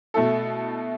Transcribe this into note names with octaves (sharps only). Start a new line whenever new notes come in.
B2 A3 E4 A4